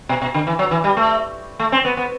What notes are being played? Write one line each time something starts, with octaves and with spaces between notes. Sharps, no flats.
B2
B2
D3
E3
F#3
E3
G3
A3
A3
C4
B3
B3